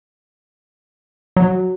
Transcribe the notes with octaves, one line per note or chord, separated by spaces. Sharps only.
F#3